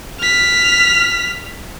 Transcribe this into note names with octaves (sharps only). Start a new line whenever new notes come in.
F6 B6